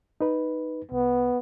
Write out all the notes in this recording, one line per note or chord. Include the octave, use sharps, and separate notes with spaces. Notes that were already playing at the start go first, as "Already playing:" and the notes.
D#4 B4
C2 B3